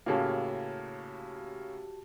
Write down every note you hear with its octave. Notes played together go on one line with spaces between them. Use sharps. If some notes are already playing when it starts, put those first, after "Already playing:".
A2 C#3 A#3 F#4 G4 A5